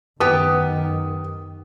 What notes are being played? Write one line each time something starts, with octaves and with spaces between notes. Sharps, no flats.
F#2 D#3 B3 G4 D#6